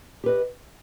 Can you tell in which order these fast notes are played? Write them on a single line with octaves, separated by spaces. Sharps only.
G4 B4 D#5